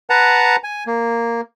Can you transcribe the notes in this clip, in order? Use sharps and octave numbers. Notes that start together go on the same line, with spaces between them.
B4 F#5 A5 A#5
G#5
A#3